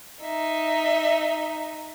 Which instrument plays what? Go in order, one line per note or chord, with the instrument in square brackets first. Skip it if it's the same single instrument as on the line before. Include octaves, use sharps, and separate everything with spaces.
[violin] D#4 E5